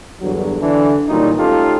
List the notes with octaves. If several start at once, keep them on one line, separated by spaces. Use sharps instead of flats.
E2 G2 D3 F#3
D3 E3 D4
A#2 D#3 E3 F#3 G3 D#4
A3 C#4 D#4 F4 G4 A4